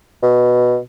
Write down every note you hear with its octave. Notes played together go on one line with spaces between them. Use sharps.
B2